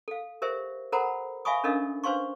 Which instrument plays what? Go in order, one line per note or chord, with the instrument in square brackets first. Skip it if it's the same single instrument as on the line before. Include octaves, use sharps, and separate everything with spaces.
[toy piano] A4 F5
G4 A#4 C5 E5
A4 A#4 C5 F#5 A#5 B5
E5 F5 G#5 B5 C#6 D#6
C#4 D4 A4 A#4 D#5 F5
D4 B4 C5 F5 C6 C#6